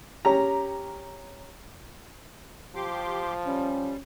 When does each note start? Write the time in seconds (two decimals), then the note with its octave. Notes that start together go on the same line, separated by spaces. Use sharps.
0.25 C#4 G4 A#5
2.75 F3 G4 C6 D6
3.46 G3 C#4